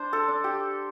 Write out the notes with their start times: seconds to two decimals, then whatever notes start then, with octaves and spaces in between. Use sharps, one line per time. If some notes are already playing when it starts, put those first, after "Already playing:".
Already playing: D4 C5
0.13 A4
0.28 D4
0.44 G4